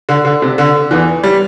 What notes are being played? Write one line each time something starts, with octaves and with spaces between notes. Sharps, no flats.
D3
D3
C3
D3
E2 E3
G3